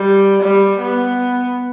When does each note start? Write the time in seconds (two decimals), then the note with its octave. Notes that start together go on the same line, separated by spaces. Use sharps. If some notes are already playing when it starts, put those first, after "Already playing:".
Already playing: G3
0.42 G3
0.80 B3